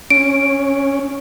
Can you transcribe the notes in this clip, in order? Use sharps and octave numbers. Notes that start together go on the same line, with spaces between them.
C#4 D7